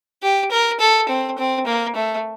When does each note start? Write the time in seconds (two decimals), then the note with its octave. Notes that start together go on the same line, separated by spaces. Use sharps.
0.23 G4
0.51 A#4
0.80 A4
1.09 C4
1.38 C4
1.66 A#3
1.95 A3